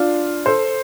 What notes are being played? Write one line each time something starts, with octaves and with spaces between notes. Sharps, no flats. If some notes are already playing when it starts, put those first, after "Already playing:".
Already playing: D4 F4
A4 C5